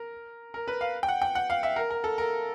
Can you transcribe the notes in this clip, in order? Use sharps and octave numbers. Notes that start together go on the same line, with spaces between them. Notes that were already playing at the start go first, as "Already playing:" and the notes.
Already playing: A#4
A#4
B4
F5
G5
F#5
G5
F#5
F5
E5
A#4
A#4
A4
A#4